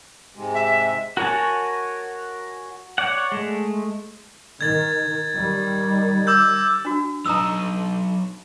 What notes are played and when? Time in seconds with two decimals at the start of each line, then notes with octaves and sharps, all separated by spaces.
0.36 G#2 C3 G#3
0.54 E5
1.17 F#4 A#4 C#5 G#5 A5
2.98 C#5 D5 F#5
3.32 G#3 A3
4.61 D#3 G#6 A6
5.32 D#3 G3
6.27 D6 E6 G6
6.85 D4 F#4
7.26 F#3 D#4 A#5 D#6 E6